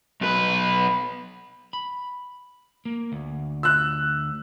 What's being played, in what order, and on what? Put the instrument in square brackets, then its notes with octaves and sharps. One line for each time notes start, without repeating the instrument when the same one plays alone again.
[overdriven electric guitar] B1 B4
[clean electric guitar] B5
A#3
D2
[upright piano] E6 F#6